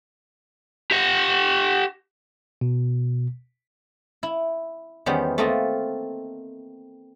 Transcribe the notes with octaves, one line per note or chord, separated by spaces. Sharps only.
G4 F#5
B2
E4
E2 D#3 G3 B3 C#4 C5
A3 A#3 C4 F4 D#5